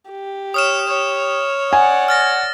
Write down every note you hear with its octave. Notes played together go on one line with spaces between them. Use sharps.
G4
C#5 D#6 F6 E7
C#5
D5 F#5 G#5
F6 A6 A#6